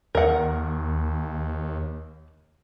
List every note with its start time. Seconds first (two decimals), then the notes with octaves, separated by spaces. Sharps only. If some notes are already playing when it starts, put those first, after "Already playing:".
0.15 D#2 A#4 F#5